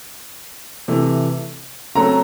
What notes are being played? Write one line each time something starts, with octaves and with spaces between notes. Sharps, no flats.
C3 E3 A3
C#3 F#3 A3 C4 A#5